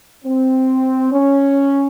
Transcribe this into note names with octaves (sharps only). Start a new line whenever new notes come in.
C4
C#4